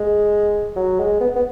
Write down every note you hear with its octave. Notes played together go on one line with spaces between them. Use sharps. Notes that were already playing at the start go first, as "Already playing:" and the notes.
Already playing: G#3
F#3
G#3
B3
B3